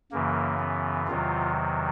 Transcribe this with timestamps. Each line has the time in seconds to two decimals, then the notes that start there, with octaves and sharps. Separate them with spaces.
0.12 F#2 C#3 E3 A#3
0.59 B3
1.07 E2 C3 D#3 F#3 F4